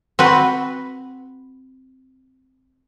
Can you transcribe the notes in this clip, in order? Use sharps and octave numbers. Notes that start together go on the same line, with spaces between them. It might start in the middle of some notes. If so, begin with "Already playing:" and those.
C4 F#4 B4